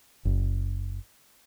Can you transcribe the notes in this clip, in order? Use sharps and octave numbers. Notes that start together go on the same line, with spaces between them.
F#1